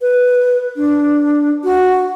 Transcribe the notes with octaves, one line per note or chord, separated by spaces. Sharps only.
B4
D4
F#4